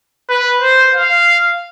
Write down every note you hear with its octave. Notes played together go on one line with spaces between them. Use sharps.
B4
C5
F5